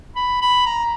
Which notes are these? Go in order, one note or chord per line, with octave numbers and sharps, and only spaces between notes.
B5
B5
A#5